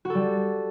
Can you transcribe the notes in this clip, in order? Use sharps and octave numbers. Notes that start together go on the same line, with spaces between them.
G3 F#4 A4